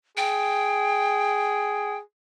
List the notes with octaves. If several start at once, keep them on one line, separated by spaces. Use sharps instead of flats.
G#4 G5